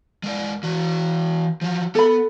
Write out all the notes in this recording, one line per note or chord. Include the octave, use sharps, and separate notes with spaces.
G#3 A#4 D5
E3 F#4
F3 F#3
B3 A4 B5